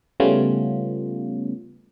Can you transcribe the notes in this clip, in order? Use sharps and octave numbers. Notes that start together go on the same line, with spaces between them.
C#3 G3 A3 B3 C#4 F4